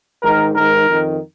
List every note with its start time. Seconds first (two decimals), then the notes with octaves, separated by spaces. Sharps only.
0.23 G#2 D#3 A#4
0.55 G#2 D#3 A#4
0.88 F2 D#3